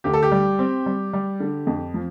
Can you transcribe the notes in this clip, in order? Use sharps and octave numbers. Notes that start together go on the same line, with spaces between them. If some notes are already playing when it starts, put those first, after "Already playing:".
D2 G4
A4
G4
G3
C4
G3
G3
D3
F2
F3